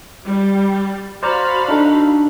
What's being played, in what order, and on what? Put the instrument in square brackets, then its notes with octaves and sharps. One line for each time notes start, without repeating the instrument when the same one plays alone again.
[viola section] G3
[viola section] F#4 F5 B5 [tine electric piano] C5 D5 A#5
[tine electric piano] D4 D#4 A4